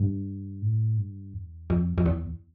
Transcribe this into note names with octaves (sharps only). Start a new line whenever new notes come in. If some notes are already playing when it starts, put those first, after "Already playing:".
Already playing: G2
A2
G2
E2
F2
F2
E2